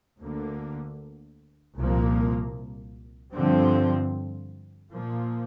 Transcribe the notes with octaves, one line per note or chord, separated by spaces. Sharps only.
D2 D3 A#3
C2 A#2 F3 A#3
G2 D3 F3 C4
A#2 F3 A#3